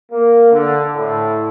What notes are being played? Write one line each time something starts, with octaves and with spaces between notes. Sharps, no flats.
A#3
D3
A2